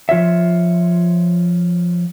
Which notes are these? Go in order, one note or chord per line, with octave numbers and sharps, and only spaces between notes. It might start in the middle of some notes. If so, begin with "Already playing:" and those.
F3 F4 C#5 E5